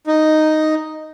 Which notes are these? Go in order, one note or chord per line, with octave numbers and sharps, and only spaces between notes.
D#4